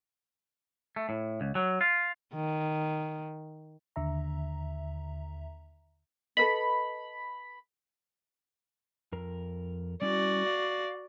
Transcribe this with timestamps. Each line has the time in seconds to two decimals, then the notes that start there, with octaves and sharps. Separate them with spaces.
0.96 A3
1.09 A2
1.41 C#2
1.55 F#3
1.81 F4
2.34 D#3
3.96 D#2 D3 E5 A#5
6.37 A4 B4 D#5 B5
9.12 F2 A#4
10.02 G3 C#4 E4 F#4 D5
10.47 F5